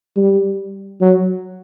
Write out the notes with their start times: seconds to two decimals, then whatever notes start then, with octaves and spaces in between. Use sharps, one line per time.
0.16 G3
1.01 F#3